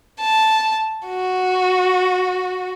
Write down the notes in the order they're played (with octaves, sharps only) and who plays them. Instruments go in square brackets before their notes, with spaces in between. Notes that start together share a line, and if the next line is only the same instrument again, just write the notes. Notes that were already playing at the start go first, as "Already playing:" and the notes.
[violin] A5
F#4